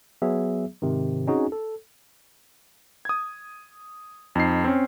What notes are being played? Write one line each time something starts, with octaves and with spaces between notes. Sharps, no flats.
F#3 B3 G#4 E5
G#2 C3 D#3
C4 C#4 D#4 F#4 G#4
A4
D#6 G#6
F2 D#4 C7
C4 C#4